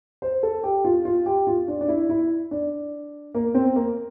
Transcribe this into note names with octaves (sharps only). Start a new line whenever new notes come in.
C5
A4
G4
F4
F4
G4
F4
D4
D4
E4
E4
D4
A#3
C4
A#3